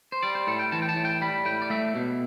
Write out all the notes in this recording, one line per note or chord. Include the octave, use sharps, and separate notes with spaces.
C5
G3 D5
C5
A2 A4
G5
E3 A5
G5
A5
A2
G5
G3 B5
A2 G5
D5
A3 E5
B2